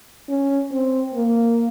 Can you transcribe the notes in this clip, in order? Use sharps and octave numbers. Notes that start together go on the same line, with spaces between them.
C#4
C4
A#3